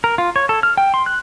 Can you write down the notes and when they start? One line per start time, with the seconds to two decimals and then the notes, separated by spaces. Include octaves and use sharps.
0.04 A#4
0.18 F4
0.36 C#5
0.49 A4
0.63 F6
0.77 G5
0.94 C6
1.06 F#6